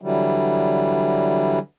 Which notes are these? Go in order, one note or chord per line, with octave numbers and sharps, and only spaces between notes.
D3 E3 F#3 G3